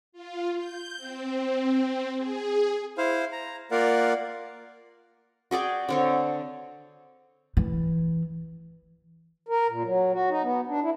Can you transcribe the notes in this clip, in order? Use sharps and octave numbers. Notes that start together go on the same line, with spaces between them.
F4
G6
C4
G#4
E4 C5 F5
A#5
A#3 F4 A#4 D5 F5 F#5
F#4 G#4 D5 G5
D3 C4 C#5
E3
A#4
A#2
F#3
F#4
D#4
B3
D4
E4